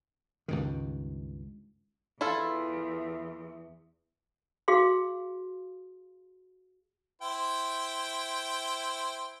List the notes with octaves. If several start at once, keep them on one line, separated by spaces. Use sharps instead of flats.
C#2 G2 D#3
E2 E4 F4 A4
F#4 G#4 F5 C6
E4 C5 G5